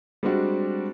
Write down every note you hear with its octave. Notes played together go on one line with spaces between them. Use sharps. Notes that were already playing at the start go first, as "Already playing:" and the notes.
G3 G#3 C4 D4 F#4 G4